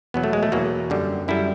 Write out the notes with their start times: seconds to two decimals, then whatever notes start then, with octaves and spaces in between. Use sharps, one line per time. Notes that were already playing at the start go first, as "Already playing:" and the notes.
0.14 E2 B2 F#3 B3
0.24 A3
0.33 G#3
0.43 A3
0.52 E2 B2 F#3 A#3
0.90 F#2 D3 G3
1.28 F#2 D3 G3 E4